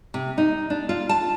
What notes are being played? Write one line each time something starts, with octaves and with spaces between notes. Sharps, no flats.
C3
D#4
D4
F4
A5